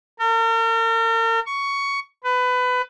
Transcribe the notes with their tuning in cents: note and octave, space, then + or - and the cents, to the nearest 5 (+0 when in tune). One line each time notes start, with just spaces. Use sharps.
A#4 -40
C#6 +10
B4 +20